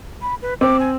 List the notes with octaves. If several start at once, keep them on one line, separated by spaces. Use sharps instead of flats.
B5
B4
C4 D6
G#5